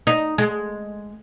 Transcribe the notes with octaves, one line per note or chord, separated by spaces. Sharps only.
D#4
G#3